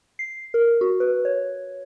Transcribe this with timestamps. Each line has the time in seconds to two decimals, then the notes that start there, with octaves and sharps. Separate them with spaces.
0.19 C7
0.54 A#4
0.81 F#4
1.00 B4
1.25 C#5